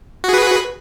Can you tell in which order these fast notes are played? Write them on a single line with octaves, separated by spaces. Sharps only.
F#4 G#4 B4